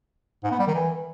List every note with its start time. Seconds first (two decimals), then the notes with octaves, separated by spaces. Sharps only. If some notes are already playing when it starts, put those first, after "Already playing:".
0.44 G#2
0.52 B3
0.59 G3
0.67 D#3
0.75 E3